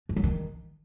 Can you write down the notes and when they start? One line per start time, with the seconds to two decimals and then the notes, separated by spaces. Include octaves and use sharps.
0.09 F3
0.16 F#3
0.24 D#3